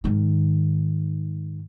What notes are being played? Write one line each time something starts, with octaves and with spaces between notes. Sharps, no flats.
G#2 D#3